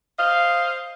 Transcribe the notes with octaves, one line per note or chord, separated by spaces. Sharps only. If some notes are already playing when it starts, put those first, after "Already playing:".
C5 D#5 F5